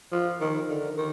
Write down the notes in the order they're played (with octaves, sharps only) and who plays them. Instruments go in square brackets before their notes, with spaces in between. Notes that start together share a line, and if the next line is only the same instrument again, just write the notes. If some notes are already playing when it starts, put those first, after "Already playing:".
[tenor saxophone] F3
D#3
D3
D#3